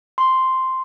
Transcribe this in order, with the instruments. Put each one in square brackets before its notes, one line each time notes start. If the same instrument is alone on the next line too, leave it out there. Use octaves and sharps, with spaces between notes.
[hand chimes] C6